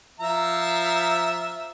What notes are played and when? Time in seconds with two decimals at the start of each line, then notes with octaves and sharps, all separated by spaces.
0.20 F3 E5 A#5